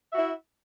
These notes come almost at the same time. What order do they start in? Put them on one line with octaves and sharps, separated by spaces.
E5 F#4 E4